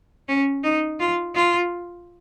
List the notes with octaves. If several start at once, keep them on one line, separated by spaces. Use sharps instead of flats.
C#4
D#4
F4
F4